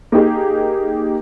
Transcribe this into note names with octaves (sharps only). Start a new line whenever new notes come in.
A#3 D#4 G4 G#4